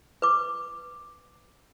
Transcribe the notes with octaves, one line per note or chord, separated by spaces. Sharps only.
B4 D6